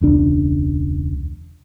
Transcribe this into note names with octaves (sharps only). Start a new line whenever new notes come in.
E1 C#2 D4